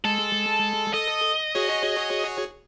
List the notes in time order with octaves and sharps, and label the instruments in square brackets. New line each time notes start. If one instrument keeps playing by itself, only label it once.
[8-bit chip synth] G#3 [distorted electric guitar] A4
[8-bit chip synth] A4 D#6 [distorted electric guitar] D#5
[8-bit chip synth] F#4 G#4 C#5